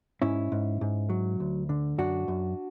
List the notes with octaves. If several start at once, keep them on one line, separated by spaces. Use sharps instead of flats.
G#2 C#4 E4
G#2
G#2
F#3
D2
D3
F#2 D4 F#4
F#2